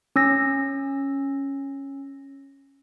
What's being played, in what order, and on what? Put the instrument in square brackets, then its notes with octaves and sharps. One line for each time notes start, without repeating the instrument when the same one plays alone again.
[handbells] C#4 E6 A#6